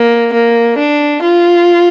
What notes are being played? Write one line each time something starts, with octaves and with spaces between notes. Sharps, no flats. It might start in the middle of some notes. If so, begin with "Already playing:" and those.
Already playing: A#3
A#3
D4
F4